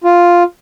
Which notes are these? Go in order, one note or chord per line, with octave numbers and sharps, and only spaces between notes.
F4